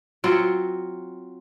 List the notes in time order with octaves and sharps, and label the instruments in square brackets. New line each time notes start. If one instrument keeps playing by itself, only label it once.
[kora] F#3 C4 F4 F#5